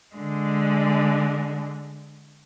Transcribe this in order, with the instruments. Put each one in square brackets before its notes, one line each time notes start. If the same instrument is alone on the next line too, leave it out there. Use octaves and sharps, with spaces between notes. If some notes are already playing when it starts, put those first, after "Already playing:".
[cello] D3 G#3